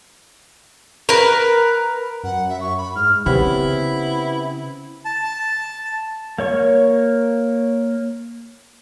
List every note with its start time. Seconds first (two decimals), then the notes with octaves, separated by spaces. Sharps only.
1.09 A#4 B4
2.23 F#2 F#5
2.49 E5
2.60 C#6
2.77 B5
2.95 G#2 F6
3.26 C#3 B3 C4 E4 G4
5.05 A5
6.38 A#3 C#5 C#6